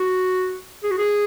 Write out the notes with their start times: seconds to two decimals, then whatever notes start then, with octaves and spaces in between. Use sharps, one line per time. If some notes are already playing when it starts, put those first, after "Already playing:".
Already playing: F#4
0.84 G#4
0.91 F#4
0.98 G#4